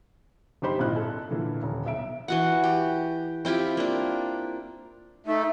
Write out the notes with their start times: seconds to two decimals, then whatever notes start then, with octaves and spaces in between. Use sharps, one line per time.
0.62 G1 D#4 G4 C5 B5
0.79 G#1 A#2 E4 D#5 F#6
0.96 A4
1.31 A#2 D3 E3
1.63 D#1
1.86 B1 E5 D7
2.28 E3 F#4 F#5
2.64 G4
3.45 C4 E4 F4 G4
3.77 A#3 D4
5.26 A3 D#4